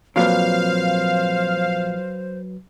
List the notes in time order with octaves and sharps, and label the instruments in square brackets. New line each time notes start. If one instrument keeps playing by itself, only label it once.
[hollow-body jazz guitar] F2 A#2 [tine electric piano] F#3 B4 [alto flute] C5 [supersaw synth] F5